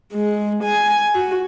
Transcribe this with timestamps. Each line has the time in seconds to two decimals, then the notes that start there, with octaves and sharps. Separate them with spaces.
0.13 G#3
0.63 G#5
1.14 F#4